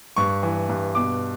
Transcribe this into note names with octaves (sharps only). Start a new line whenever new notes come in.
G2 C#6
E3
G2
B2 D6